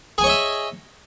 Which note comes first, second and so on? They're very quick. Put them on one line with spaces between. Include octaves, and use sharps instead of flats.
G#4 G#5 C#5 D#5 E5